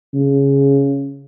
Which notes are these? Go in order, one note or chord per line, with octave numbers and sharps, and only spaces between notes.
C#3